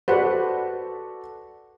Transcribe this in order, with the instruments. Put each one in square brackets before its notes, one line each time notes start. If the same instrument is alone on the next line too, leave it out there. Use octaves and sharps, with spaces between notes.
[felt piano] F#4 A4 D5 [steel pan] B4 C5 F#5